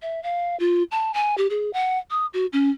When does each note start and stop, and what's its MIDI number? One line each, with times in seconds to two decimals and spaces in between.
0.02 0.22 76
0.23 0.58 77
0.60 0.83 65
0.91 1.12 81
1.14 1.35 80
1.38 1.47 67
1.50 1.73 68
1.73 1.99 78
2.10 2.26 87
2.34 2.46 66
2.53 2.70 61